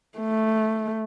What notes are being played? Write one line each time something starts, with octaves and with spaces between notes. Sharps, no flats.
A3